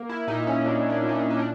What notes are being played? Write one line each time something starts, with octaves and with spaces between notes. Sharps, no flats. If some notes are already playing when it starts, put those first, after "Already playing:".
Already playing: A#3
E4
A#2 D#4
C#4
A#2 D4
D4
A#2
D#4
D4
D#4
D4